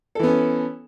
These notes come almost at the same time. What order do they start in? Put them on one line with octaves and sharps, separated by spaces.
A4 E3 B3 C#4